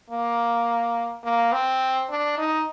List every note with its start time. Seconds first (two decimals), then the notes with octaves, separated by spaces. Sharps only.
0.10 A#3
1.24 A#3
1.52 C4
2.10 D4
2.38 D#4